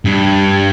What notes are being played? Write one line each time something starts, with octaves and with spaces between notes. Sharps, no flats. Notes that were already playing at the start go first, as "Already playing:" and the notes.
G2